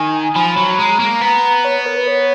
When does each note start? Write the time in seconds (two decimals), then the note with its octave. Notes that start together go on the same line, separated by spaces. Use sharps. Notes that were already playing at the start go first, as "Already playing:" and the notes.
Already playing: D#3 G#5
0.36 F3 B5
0.57 F#3
0.79 G#3 A#5
1.00 A#3
1.21 B3 A#5
1.65 C#5
1.86 A#4
1.96 B4
2.07 C#5